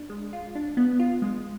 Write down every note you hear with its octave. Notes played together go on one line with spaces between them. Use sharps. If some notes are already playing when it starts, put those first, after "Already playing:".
Already playing: D4
G#3
F4
D4
B3
F4
G#3